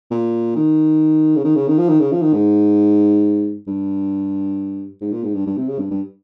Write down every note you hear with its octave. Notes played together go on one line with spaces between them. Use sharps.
A#2
D#3
C#3
D#3
C#3
D#3
F3
D#3
C#3
F3
D#3
G#2
G2
G#2
A#2
G#2
G2
G2
C3
C#3
G2
G2